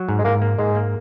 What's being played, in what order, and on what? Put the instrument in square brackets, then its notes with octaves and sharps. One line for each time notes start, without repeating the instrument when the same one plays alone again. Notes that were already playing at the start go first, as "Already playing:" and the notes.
Already playing: [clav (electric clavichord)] F#3
G#2
[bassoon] G#3
[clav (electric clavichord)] G#2 [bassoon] A#3
[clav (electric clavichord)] A#3
[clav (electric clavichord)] G#2 [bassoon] G#3
[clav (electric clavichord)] A#3